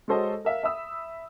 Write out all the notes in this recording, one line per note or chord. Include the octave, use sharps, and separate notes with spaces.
G#3 F#4 A4 C5 C#5 D#5
A#4 E5 F5
E5 B5 D#6 E6